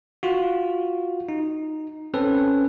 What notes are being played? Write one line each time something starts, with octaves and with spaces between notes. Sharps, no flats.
F4 F#4
D#4
C4 C#4 A4 B4